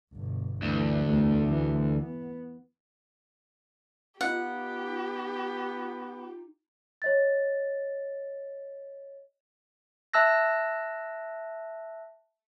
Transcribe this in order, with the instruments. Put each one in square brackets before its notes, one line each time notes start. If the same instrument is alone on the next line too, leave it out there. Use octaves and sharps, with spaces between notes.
[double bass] G1 B2
[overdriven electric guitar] D2 [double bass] E3
[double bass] E2 A3
E3
B3
[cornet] B3 [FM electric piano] D#4 F4 [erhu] G4 [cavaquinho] F#5
[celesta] C#5 D#5 A6
[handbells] E5 A5 E6 F#6 A#6